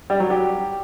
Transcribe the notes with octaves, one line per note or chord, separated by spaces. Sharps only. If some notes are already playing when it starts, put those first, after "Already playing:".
G3
F#3
G4